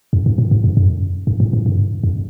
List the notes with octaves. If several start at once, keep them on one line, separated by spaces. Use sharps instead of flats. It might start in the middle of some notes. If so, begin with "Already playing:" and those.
F#2
G#2
A2
G#2
F#2
F#2
G2
A2
G#2
G2
F#2